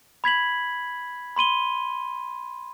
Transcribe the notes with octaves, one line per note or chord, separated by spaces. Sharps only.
B5 G#6 B6 F#7
B5 C6 D#7 G7